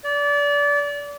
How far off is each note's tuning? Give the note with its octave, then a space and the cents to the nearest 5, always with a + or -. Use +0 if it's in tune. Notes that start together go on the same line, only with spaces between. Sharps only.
D5 -25